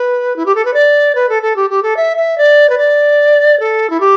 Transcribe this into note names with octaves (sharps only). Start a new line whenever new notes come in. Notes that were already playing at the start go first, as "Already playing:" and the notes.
Already playing: B4
E4
G4
A4
B4
D5
B4
A4
A4
G4
G4
A4
E5
E5
D5
B4
D5
A4
E4
G4